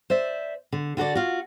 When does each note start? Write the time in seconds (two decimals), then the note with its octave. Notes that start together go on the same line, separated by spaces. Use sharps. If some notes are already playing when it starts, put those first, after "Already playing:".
0.10 C5 D5 E5
0.72 D3
0.97 D3 F#4 A4 D5
1.15 F4 F#4